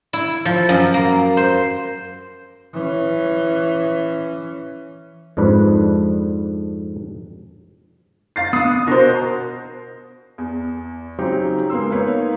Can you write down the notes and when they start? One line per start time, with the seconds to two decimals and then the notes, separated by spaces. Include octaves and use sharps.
0.13 E4
0.45 F3
0.69 F#2
0.94 A#3
1.37 C5
2.74 E3 C#4
5.37 F2 G#2 D4 B4
8.36 F5 A6 C7
8.53 B3 D4 D#6
8.87 B2 F#4 A#4 C5
10.38 E2
11.18 C#3 F#3 C4 D#4 G4
11.70 G#3 A#3 B3 C6 E6
11.91 A#3 B3 D#4 B4 C#5